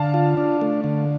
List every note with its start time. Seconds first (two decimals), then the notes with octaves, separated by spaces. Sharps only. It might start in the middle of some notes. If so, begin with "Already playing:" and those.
Already playing: D3 F5 A5
0.14 F4
0.37 D4
0.61 A3
0.84 D3